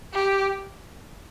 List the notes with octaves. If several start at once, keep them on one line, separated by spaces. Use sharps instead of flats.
G4